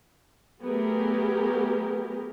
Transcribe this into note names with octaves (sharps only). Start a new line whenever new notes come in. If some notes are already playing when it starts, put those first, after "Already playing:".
F#3 A3 B3 G4 G#4 A#4